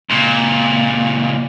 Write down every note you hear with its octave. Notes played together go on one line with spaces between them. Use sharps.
C#2 A#2